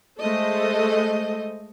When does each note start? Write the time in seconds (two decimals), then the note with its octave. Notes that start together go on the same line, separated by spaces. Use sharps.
0.20 G#3 A3 A4 C5 D#5